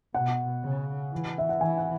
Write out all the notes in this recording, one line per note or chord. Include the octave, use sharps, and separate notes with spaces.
B2 F#5
C#3
E3
E5
F#5
E3 G#5
F#5